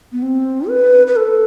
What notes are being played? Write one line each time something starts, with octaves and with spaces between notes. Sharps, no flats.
B3
C4
B4
B4
A4